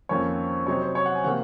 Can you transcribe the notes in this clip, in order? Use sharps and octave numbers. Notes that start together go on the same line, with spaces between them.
F2 D#3 A#3 C#4 C#5
C3 F#3 C4 D#4 C#5
C5
C#5
F#5
G#5
C3 D#3 A#3 F#5